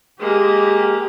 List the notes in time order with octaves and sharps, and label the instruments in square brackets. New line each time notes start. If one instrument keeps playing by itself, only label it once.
[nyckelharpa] G#3 A#3 [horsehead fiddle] G4